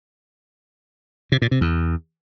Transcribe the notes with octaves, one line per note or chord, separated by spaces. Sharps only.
C3
A#2
C3
E2